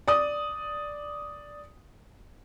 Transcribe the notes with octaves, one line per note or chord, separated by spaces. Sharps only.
D5 D#6